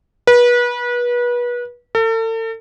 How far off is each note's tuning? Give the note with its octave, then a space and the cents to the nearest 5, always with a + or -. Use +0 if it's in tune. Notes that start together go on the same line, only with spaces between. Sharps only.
B4 -30
A4 +40